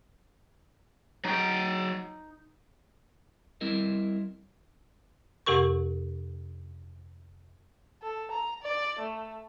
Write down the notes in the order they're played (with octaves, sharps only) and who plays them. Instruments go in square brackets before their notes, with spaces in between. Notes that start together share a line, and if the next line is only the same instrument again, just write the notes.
[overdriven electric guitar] F#3 G5 [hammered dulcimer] D#4
[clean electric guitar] G3 C4 E4 A#4 D#5
[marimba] F2 C3 G4 A#4 C#6
[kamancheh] A4
A#5
D5
A3